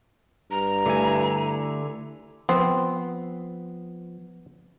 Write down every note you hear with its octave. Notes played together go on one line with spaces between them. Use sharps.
G2 A#5
D3 A3 E4 G#5
F3 B3 C4